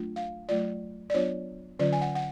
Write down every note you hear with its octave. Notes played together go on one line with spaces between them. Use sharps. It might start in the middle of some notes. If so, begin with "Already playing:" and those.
Already playing: F#3 A3 D4 F4
F5
F#3 A3 F4 D5
D5
F#3 B3 D4 F4 C#5
D3 F#3 C#4 F4 D5
G#5
F#5
F#5